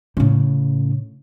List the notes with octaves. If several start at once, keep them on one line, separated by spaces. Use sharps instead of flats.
A2 C#3